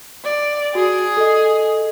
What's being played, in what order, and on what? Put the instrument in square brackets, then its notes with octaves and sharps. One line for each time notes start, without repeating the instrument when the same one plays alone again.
[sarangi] D5
[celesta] F#4 [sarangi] G#4
[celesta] A4 D#5